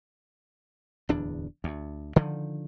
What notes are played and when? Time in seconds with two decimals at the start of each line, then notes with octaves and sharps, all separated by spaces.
1.09 D1 E2 D4
1.64 D2
2.16 D3 D#3 F3